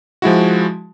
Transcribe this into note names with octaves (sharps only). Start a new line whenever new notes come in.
F3 G#3 E4 F#4